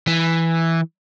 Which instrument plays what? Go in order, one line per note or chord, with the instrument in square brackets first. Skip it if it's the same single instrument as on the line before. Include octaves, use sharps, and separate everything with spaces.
[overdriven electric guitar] E3